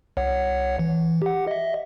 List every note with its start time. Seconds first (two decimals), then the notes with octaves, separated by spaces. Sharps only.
0.17 C2 C#5 F#5
0.79 E3
1.22 G4 F#5
1.47 D#5 E5